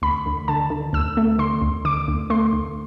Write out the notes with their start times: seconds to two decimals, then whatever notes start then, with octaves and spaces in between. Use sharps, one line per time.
0.02 D2 B5
0.26 D2
0.48 D3 A5
0.70 D3
0.93 D2 E6
1.17 A3
1.39 D3 C6
1.62 D2
1.85 D3 D6
2.08 D2
2.30 A3 C6
2.53 D2